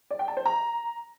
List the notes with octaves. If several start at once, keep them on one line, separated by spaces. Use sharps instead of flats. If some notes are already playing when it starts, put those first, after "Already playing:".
D5
G5
A5
C5
A#5